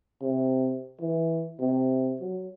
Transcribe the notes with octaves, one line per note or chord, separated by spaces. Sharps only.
C3
E3
C3
F#3